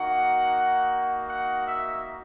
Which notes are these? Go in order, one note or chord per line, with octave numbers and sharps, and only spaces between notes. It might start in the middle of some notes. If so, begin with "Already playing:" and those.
Already playing: A#3 D#4 F#4 F#5
F#5
E5